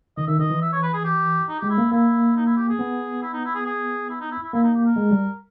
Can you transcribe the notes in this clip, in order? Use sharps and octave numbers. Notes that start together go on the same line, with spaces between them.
D#3 D#5
D#3 E5
D#3 D#5
E3
E5
C#5
B4
G#4
G4
D#4
G#3 G4
E4
A#3
A#3 E4
D#4
E4
G4
G#4
B3
E4
D#4
E4
G#4
G#4
E4
D#4
E4
E4
A#3 E4
D#4
G4
A#4
G#3
G3